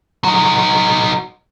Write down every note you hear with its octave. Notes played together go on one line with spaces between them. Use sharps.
F#3 D#4